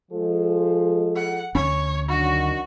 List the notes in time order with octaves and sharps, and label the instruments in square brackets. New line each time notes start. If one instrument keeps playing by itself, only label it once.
[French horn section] F3 G#3 A4
[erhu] F#5
[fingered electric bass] D2 C#4 [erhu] C#5
[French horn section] D#3 F#3 D4 [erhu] F#4